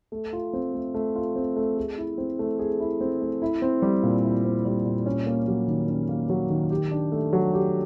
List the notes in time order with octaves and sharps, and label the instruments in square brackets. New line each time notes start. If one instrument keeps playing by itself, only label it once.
[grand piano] A3
F4
C4
A3
A3
F4
C4
A3
G#4
E4
C4
A3
G#4
E4
C4
A3
E4
C4
G3
A#2
E4
C4
G3
A#2
C#4
A#3
F#3
D#3
C#4
A#3
F#3
D#3
G4
D4
A3
F#3
G4